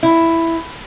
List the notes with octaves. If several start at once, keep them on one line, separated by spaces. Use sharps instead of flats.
E4